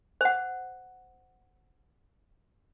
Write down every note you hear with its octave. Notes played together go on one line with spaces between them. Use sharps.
C5 F#5